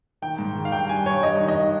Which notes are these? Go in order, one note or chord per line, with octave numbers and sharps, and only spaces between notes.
D#3 G5
G#2
D#3
F5
G2 G5
G2 G#5
G2 C#5
G2 D#5
D#3
D#5
D#3